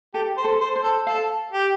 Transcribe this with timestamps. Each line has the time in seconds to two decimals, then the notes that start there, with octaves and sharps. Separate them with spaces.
0.14 G4 A4
0.37 C5
0.44 A4
0.60 C5
0.76 C5
0.84 A4
1.07 A4 F5
1.53 G4